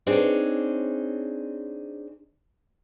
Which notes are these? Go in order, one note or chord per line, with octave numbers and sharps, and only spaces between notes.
C4 D4 D#4 G#4 C#5